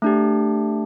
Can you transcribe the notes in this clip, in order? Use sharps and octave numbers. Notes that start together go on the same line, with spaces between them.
A3 D4 G4